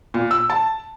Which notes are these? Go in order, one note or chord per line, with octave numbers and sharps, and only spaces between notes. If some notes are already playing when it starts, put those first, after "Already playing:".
A#2
E6
A5